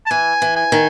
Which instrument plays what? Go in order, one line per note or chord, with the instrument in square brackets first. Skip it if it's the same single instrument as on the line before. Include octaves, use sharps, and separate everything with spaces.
[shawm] A5
[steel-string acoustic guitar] E3 [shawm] G#5
[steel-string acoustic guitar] E3
[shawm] G#5
[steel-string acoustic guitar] D#3